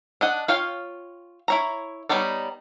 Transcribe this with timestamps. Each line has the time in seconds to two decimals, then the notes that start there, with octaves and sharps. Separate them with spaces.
0.21 D4 D#5 F#5
0.48 F4 C#5 F5 G5
1.48 E4 C#5 A#5
2.09 G3 B3 D#4 C#5 D5